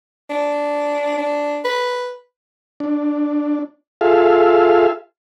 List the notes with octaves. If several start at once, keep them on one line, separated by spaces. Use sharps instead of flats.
D4
D4
B4
D4
F4 G#4 A4 E5 F5